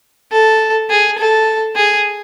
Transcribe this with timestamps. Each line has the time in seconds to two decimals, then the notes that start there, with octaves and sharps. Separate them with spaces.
0.32 A4
0.90 G#4
1.18 A4
1.76 G#4